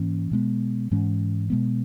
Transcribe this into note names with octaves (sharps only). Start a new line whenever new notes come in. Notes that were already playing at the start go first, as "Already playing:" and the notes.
Already playing: G#2 E3 A#3 C#4
B2 G#3 B3
G#2 E3 G#3 C#4
B2 G#3 B3